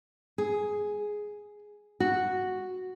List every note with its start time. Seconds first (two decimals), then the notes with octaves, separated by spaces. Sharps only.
0.38 G#4
2.00 F#4